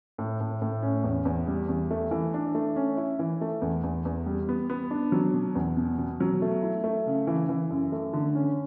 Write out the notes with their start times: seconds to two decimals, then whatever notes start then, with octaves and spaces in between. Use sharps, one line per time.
0.18 A2
0.41 A2
0.62 A2
0.83 C#4
1.04 E2
1.25 E2
1.47 G3
1.69 E2
1.91 A3
2.11 E3
2.34 D4
2.55 A3
2.76 C#4
2.97 E4
3.19 E3
3.41 A3
3.62 E2
3.84 E2
4.05 E2
4.26 G3
4.49 B3
4.70 B3
4.91 D4
5.12 F#3
5.33 B2
5.55 E2
5.77 B2
5.98 B2
6.20 F#3
6.42 A3
6.63 E4
6.84 A3
7.06 C#3
7.27 E3
7.49 E3
7.70 F#2
7.92 A3
8.13 D3
8.35 C#4